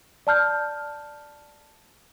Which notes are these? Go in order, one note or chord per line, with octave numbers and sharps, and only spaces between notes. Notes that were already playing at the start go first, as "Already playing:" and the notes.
D5 A5 F6 G6